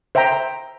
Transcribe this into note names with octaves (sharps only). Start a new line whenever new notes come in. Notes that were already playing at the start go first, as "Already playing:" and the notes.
C5 E5 G5 A#5